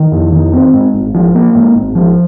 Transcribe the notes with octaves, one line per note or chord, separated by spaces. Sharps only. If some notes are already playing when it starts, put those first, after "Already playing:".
Already playing: D#3
F2
D#3
C4
G#2
G#1
F3
A#3
G#2
G#1
F3